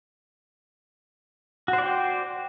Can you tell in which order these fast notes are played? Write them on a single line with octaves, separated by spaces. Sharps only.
F#4 C5 D5 G5